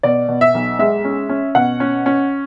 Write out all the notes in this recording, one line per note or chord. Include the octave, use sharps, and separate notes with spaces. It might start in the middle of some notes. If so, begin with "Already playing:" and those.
B2 D5
B2
E5
B1
G#3 E5
C#4
C#4
B2 F#5
C#4
C#4